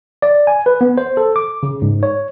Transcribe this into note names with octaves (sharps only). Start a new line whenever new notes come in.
D5
G#5
B4
B3
C5
A4
D6
C#3
G#2
C#5